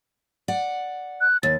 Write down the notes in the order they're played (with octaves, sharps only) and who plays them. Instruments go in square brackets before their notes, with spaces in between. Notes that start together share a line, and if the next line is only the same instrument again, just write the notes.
[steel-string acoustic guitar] D5 F#5
[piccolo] F#6
[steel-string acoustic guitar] D#2 [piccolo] A6